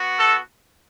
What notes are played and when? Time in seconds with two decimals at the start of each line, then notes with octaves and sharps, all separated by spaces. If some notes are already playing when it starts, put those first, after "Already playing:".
Already playing: B3 F#4
0.19 A4